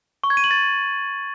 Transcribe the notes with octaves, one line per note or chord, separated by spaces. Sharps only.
C#6
G#6
D#7
F#7
A6